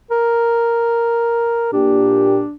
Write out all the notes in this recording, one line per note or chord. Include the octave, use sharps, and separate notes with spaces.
A#4
A#2 D4 G4